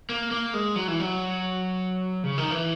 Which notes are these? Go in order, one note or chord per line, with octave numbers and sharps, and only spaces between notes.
A#3
A#3
G#3
F#3
E3
F#3
C#3
D#3
E3